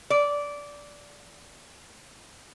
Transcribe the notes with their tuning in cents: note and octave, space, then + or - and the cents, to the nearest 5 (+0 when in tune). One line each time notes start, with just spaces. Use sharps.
D5 -15